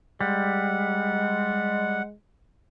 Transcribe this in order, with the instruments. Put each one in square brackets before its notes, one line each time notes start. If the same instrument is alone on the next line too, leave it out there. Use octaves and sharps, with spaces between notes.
[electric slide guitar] G3 [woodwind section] G#3 [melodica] F#5